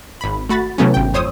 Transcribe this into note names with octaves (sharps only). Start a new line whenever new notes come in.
G#1 B5
A3 F#4 B5 A6
C3 E3 F#3 A3 B3 C#4
G#1 G5
F2 C5 C#5 D#6 E6